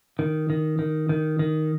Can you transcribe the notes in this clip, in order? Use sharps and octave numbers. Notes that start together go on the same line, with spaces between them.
D#3
D#3
D#3
D#3
D#3